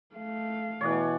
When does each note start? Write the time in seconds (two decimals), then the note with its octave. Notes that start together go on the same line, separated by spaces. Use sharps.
0.15 A3 F5
0.81 B2 E3 C#5 D5 F#5